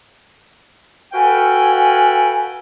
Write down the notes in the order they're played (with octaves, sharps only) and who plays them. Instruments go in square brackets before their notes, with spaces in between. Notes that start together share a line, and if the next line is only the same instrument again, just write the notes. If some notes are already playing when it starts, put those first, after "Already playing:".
[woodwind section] F#4 A4 B4 F5 G5 G#5